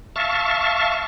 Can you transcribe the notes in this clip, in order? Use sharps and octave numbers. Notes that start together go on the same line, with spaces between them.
E5 F5 A5 C#6